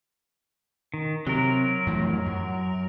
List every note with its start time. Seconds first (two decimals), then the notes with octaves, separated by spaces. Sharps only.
0.94 D#3
1.27 C3 F#3 A#4
1.87 F2 A2 E3
2.26 F#2